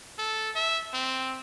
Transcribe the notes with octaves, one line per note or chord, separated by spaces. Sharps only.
A4
E5
C4